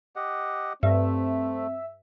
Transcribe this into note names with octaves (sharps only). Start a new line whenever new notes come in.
G4 D#5 F#5
G2 A3 C4 E5